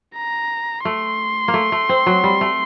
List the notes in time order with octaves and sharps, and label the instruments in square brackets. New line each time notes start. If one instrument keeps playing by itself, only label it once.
[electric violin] A#5
[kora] A3 [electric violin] C6
[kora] A#3
A3
A3
C4
F#3
G3
A3